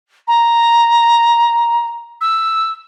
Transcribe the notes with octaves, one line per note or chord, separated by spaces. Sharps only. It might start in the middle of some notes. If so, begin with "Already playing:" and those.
A#5
E6